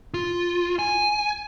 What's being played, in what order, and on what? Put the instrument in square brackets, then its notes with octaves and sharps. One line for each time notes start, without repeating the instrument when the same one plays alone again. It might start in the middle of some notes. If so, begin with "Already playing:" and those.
[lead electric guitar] F4
G#5